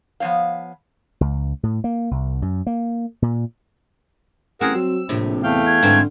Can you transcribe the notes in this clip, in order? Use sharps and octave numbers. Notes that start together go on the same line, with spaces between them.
F3 B3 C#4 C#5 F5
C#2
A2
A#3
C2
F#2
A#3
A#2
A1 C4 G#4 A#4 F#5
F#3 E6
A#1 A2 C3
E2 A3 F5 G5
G#6
G#2 D3 E3 C4